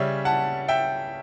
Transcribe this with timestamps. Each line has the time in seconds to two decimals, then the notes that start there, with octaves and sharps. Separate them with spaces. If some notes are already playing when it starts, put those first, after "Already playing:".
Already playing: C#3 G3 C#4 C#5 E5
0.25 F#5 A5
0.68 E5 G5